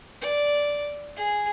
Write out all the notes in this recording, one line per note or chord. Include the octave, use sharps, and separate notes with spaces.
D5
G#4